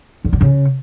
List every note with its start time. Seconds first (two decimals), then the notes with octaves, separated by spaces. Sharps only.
0.24 E2
0.33 D3
0.41 C#3